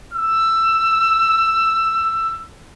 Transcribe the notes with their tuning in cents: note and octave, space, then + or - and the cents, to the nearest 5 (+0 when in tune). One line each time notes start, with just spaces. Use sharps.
E6 +15